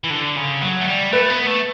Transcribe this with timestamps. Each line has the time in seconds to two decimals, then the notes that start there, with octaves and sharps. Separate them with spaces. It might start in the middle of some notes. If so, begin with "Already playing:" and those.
0.04 E3
0.10 D3
0.36 C#3
0.61 F#3
0.81 A3
0.87 G3
1.12 A3 B4
1.30 B3
1.47 A3